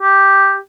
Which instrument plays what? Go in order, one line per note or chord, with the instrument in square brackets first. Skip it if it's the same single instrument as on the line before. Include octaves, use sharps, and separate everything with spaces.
[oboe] G4